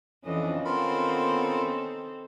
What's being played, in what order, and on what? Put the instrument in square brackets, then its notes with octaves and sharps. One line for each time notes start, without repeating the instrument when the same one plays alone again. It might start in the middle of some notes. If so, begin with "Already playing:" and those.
[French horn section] F2 [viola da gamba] E3 D4 D#5 [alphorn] C#4
[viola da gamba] D#3 C4 A4 [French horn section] B3 [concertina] F4 A#4 B5